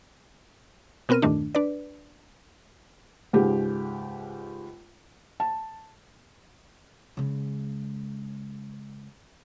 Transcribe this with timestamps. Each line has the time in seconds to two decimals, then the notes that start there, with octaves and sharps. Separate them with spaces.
1.09 B2 B3 C4 A#4 F6 D#7
1.22 E2 G2 A#2 D#3 A3 D4
1.55 D4 B4 D5
3.33 C#2 G#2 G4
5.40 A5
7.17 C#3 G#3